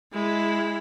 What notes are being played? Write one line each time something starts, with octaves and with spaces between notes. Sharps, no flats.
G#3 E4